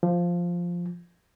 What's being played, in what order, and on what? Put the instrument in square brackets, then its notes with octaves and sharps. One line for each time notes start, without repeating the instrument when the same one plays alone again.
[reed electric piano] F3